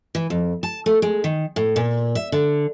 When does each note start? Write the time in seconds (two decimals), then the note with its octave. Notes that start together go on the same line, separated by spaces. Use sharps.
0.15 E3
0.30 F2
0.63 A5
0.86 A3
1.02 G#3
1.24 D#3
1.56 A2
1.76 A#2
2.15 E5
2.32 D3